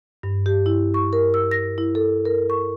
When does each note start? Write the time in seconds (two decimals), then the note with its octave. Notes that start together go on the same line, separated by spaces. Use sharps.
0.23 G2
0.46 G4
0.66 E4
0.94 C#6
1.13 A#4
1.34 E6
1.51 A#6
1.78 E4
1.95 A4
2.25 A#4
2.50 C#6